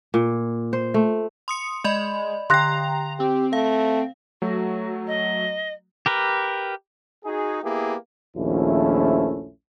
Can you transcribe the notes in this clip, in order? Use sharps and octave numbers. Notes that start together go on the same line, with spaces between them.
A#2
C5
A3
C6 D#6 C#7
G#3 D5 D#5 B5
D3 G5 A#5 C6 F#6 A#6
C4 G4
A3 F5
F#3 A3 F#4
D#5
G4 A#4 B4
D#4 F#4 G#4
A#3 B3 E4 G4 G#4
A#1 D#2 F3 A3 C#4 E4